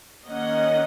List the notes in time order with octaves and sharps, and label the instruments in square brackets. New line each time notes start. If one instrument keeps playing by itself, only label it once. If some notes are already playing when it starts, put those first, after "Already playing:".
[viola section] D#3 A#3 C#4 D#5 F#5